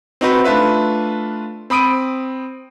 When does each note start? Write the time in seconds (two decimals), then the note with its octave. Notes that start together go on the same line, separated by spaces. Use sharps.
0.21 C4 D#4 F#4 B4
0.44 A3 D4 F4 B4 E5
1.70 C4 B5 D#6 D7 D#7